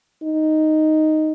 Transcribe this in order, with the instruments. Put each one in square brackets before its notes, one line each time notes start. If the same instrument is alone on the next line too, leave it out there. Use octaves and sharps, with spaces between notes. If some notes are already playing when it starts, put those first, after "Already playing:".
[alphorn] D#4